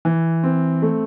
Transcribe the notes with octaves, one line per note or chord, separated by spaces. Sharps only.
E3
C4
A3